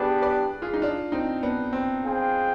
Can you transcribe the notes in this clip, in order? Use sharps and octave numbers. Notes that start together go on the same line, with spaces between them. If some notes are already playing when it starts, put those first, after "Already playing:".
Already playing: B3 D4 G4 G#4 B4 D5
B4 D5
F4 G#4
D#4
D4 F4
C4 D#4
B3 D4
C4
F4 G#4 C5 G5